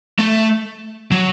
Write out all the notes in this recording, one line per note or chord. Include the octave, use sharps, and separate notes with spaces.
A3
F#3